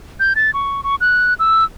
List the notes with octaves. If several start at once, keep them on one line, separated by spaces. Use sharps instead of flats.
G6
A6
C#6
C#6
F#6
E6